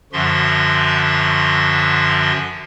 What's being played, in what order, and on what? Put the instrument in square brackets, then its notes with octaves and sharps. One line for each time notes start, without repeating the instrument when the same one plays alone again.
[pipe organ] F#2 D3 F3 F#4 E5 C6